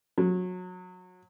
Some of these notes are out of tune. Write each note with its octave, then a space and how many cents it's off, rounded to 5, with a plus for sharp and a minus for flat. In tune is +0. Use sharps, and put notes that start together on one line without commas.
F#3 -25